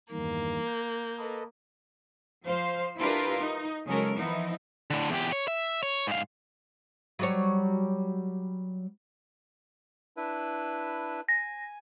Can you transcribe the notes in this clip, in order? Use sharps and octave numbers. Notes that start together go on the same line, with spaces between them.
E2 G2 D#3 A#3
G6
A4 B4 D#5
F3 C5 F5
D4 E4 F4 G4 A#4 B4
D#4
C#3 F#3 G#3 C#4 A4 A#4
E3 F3 B3 D#4 E4
A2 D3
E2 G4
C#5
E5
C#5
G#2 F5
F#3 G3 C#5
D4 E4 B4
G#5 A#6